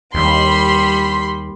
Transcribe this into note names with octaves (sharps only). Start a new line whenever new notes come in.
D#2 G3 B5 C6